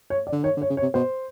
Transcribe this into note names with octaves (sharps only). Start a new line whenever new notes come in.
C#5
D5
D3
D#3 C#5
D3
C#5
C#3
C#5
C3
B2 C5